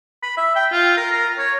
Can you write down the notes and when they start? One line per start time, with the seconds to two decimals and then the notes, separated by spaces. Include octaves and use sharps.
0.23 B5
0.37 E5
0.55 G5
0.72 F4
0.97 A#4
1.13 A#4
1.38 C#5